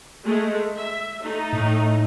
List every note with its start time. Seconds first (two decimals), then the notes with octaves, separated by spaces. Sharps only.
0.23 G#3 A3
0.77 E5
1.22 A3 D#4
1.53 A2